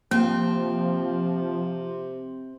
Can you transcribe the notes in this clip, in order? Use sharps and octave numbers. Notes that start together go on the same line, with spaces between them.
C3 F3 A#3 C4